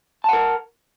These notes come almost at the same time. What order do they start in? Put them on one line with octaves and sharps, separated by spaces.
A5 F#5 A#4